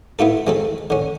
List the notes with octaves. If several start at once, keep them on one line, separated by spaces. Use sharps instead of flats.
B3 E4 F4 A4
G#3 C4 A4
D3 C#4